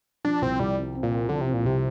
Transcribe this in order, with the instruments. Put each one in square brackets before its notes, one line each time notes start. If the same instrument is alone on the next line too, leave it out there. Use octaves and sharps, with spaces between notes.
[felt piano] F3 [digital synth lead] D4
[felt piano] C2 [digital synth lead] C4
[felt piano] C2 [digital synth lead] G3
[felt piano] C4
C4
[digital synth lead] A#2
[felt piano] C4
[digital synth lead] D3 [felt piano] F3
[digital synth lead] C3
[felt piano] C4
[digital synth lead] A#2
[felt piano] C2 [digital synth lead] C3